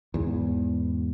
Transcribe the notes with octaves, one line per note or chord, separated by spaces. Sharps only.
E2 G#2